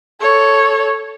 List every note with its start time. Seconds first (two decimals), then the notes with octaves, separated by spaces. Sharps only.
0.21 A4 C#5